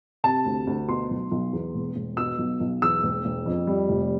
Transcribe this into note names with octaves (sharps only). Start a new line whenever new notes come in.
C3 A5
D2
D2
B2 C6
B1
B1
E2
E1
E1
B2 E6
B1
B1
E2 E6
E1
E1
F2
G3
F1